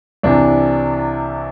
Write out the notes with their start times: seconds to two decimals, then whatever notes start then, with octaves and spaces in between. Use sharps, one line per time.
0.23 C2 C3 E3 D4